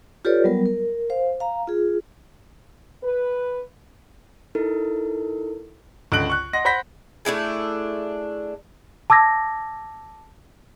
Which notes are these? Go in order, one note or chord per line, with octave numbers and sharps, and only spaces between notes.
F4 G4 A4 B4 C#5 D5
F#3 G3 B3 A#4
A#4
C5 F5
F5 A#5
F4 G#4
B4
D#4 E4 A4 A#4
C#2 D3 F#6 D7 F#7
C#6 F#6
D#5 F#5 C6 A#6
C5 F#5 B5 G6 A#6 B6
A3 D4 E4 G#4
A5 D6 E6 G#6 A#6